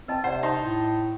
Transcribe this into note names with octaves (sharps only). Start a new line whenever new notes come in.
C4 B4 D#5 A5
C3 C5 D5 F#5
D#4 A5 C6
A2